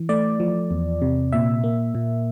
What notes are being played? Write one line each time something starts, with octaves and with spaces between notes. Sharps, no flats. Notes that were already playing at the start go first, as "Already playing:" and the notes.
Already playing: E3
A3 D5
F3
E2
C3
A#2 E5
A#3
A#2